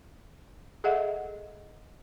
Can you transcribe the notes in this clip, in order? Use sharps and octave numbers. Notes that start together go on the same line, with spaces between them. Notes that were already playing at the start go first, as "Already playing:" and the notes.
G#4 A4 D#5 E5 F#5